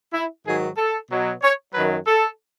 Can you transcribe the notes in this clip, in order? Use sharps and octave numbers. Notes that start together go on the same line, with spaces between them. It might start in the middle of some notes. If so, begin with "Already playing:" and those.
E4
G#2 D#3 F#3 G#4
A4
B2 F#3
C#5
F#2 D#3 F#3 B4
A4